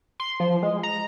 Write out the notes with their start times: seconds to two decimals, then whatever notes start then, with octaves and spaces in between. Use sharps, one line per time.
0.20 C6
0.40 F3
0.63 G#3
0.83 A#5